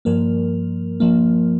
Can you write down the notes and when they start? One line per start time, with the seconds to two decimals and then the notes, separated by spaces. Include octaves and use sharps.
0.05 G2 F3 A#3 A#4
1.00 F3 A#3